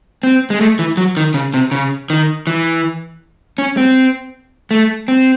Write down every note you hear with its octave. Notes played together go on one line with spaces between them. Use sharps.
C4
G#3
A3
E3
F#3
D#3
C#3
C3
C#3
D#3
E3
C#4
C4
A3
C4